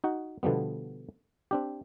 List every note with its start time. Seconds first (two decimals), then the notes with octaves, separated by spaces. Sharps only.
0.04 D#4 F#4 F#5
0.43 B2 D3 F3 G3 B3
1.51 C4 D4 G4